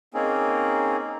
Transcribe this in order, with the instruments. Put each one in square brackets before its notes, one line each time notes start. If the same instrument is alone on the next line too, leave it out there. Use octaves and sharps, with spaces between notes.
[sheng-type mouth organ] A#3 C4 C#4 D#4 G#4